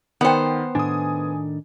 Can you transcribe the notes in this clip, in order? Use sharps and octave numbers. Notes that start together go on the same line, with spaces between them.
D#3 B3 C5 F#5 G5
A2 D#3 D4 G#5 D#6